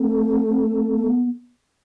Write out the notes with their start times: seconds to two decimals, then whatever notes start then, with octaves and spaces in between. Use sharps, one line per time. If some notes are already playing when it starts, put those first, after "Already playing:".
Already playing: A3 C4
0.98 B3